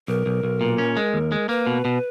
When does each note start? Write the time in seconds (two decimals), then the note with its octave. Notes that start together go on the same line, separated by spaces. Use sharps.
0.08 B1 A#4
0.26 B1
0.43 B1
0.61 A#2
0.78 C#4
0.97 G#3
1.14 D#2
1.32 G#3
1.49 A#3 B4
1.67 B2
1.85 B2